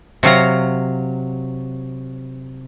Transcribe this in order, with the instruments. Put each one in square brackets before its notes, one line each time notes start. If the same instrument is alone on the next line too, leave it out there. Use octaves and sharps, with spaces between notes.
[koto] C3 F#3 F5 A#5